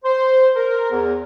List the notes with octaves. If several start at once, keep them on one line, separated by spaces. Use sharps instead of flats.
C5
A#4
E2